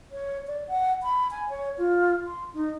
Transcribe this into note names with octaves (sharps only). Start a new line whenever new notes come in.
C#5
D5
F#5
B5
G#5
C#5
F4
C6
D#4